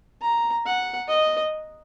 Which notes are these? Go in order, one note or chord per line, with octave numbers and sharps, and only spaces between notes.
A#5
F#5
D#5